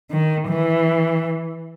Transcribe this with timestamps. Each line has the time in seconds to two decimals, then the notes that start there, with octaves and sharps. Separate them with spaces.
0.11 D#3
0.49 E3